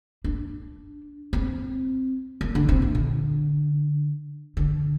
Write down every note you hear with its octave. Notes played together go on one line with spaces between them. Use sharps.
D4
C4
A#3
D3
C3
A#2
D3
D3